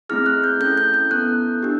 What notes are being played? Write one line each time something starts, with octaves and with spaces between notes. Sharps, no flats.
A3 C4 E4 G#4 F6
F#6
G6
C#4 E4 A4 G6
G6
G6
B3 E4 A4 F#6
D4 G4